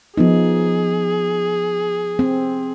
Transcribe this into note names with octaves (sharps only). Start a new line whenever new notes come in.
F3 B3 D#4 G#4
C4